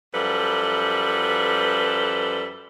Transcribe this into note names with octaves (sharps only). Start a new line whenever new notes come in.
F#2 F3 G3 A4 B4